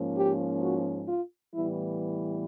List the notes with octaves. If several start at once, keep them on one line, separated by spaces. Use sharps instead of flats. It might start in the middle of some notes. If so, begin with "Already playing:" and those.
Already playing: G#2 F3 A#3 C#4
G4
F#4
F4
A2 E3 G3 B3 E4